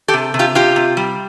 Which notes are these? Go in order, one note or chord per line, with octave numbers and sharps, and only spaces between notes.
G4 A4
C3
C3
F4 G4
C3 F4 G4
C3
G3